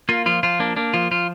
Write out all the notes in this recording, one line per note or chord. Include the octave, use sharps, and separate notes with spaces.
A#3 F4
F3 F4
F3 F4
A#3 D4
A#3 D4
F3 F4
F3 F4